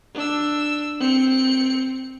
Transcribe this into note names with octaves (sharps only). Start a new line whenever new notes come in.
D4 E6
C4 C#7